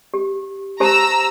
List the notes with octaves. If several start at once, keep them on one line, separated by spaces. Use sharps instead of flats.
G4
G4 C5 A5 A#5 E6